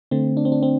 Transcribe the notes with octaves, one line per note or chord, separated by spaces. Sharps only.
D3 A3 C4
D4
C4
D4
C4